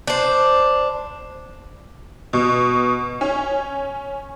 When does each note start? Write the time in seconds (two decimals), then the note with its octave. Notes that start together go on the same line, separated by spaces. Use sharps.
0.07 D4 C5
2.33 B2
3.21 C#4